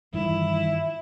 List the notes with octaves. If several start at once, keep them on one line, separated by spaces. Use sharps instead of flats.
G2 D#3 E3 E4